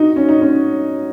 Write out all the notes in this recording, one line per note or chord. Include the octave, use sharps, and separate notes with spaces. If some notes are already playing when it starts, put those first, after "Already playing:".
Already playing: D#4 F#4
C#4
D#4
C#4